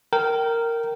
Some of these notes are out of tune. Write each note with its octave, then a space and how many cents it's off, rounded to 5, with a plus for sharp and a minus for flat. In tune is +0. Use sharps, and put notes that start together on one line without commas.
A#4 -10 G5 -20